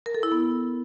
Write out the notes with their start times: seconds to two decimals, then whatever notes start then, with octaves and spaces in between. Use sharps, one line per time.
0.06 A#4
0.15 A4
0.23 E4
0.32 B3